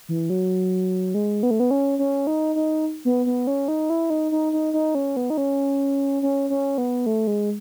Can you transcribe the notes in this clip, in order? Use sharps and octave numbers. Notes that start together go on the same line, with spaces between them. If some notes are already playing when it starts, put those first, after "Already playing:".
E3
F#3
G#3
B3
A3
B3
C#4
C#4
D#4
D#4
B3
B3
C#4
D#4
E4
D#4
D#4
D#4
D#4
C#4
B3
D#4
C#4
C#4
C#4
B3
A3
G#3